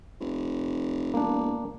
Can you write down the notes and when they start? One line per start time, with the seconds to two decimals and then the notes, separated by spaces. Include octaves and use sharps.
0.20 F1
1.14 E1 A#3 D4